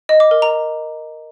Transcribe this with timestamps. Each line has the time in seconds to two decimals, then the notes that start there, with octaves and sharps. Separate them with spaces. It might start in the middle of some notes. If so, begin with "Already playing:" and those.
0.09 D#5
0.20 D6
0.31 A#4
0.42 A#5